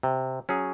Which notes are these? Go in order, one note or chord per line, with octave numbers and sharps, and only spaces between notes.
C3
F#3 C#4 G#4